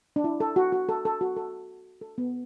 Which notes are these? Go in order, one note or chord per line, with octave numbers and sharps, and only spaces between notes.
D4
E4
A4
F#4
F#4
A4
A4
F#4
A4
A4
B3